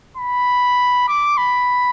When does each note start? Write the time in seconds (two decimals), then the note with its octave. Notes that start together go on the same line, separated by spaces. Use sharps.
0.17 B5
1.08 D6
1.37 B5